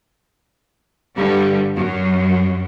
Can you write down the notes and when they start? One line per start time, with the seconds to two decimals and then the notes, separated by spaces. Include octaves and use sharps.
1.16 G2 D3 G3
1.77 F#2